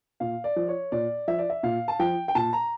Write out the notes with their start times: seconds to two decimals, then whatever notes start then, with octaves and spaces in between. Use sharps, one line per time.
0.20 A#2 F5
0.44 D5
0.56 F3
0.68 C#5
0.92 A#2 D5
1.28 F3 E5
1.38 D5
1.50 E5
1.63 A#2 F5
1.88 A5
1.99 F3 G5
2.28 G5
2.35 A#2 A5
2.53 A#5